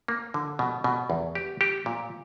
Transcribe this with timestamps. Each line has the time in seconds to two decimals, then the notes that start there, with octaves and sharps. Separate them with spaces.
0.08 A#3
0.34 D3
0.59 B2
0.84 B2
1.10 E2
1.35 G4
1.61 G4
1.86 A#2